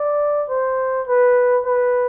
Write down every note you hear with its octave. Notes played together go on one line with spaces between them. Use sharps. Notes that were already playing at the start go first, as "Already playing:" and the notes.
Already playing: D5
C5
B4
B4